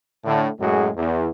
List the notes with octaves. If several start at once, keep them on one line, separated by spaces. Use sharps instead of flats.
A2 D3
F#2 A2 G#3 F#4 G#4
E2